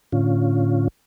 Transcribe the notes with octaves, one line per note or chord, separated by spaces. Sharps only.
A2 D3 C#4 F4